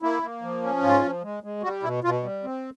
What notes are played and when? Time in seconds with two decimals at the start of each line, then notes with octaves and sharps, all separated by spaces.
0.02 A#3 E4
0.23 A#3
0.42 F3
0.63 C#4
0.83 G#2 F4
1.03 F3
1.23 G#3
1.43 G#3
1.63 G3 F#4
1.83 B2 E4
2.04 B2 F4
2.23 G3
2.44 C4